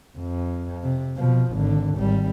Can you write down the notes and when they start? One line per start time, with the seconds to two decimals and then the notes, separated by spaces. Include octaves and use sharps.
0.18 F2
0.83 C3
1.17 B2 F3
1.53 G#1 D3
1.96 G#1 G3